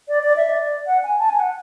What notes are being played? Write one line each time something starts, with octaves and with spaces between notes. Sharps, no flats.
D5
D5
E5
D5
F#5
G#5
A5
G#5
F#5